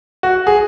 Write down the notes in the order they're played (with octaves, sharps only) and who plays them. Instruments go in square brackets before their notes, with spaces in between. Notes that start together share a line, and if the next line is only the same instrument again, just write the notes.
[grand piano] F#4
G#4